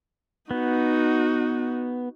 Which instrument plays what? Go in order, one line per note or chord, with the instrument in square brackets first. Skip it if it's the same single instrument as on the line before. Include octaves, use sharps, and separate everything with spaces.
[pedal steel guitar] B3 [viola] D#4 F#4